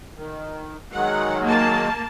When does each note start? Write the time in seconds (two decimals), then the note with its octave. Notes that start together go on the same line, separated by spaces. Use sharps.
0.16 D#3
0.94 D#3 F#3 G#3 F#5
1.45 A#3 A5